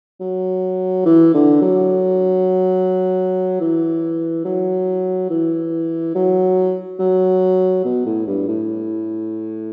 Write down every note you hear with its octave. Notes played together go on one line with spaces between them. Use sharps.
F#3
E3
D3
F#3
E3
F#3
E3
F#3
F#3
B2
A2
G2
A2